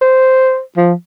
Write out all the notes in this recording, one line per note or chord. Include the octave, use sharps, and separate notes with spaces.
C5
F3